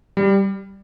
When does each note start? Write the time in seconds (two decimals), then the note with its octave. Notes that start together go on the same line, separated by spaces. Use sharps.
0.17 G3